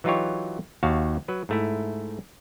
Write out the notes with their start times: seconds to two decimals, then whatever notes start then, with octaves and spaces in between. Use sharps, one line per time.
0.04 E3 F#3 D#4 F4 G4 C#5
0.83 D#2 F#4 F5 A5
1.28 F#3 B4
1.49 G#2 A3 E4